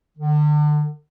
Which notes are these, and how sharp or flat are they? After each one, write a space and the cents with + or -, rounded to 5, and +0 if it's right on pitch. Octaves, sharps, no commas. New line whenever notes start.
D3 +35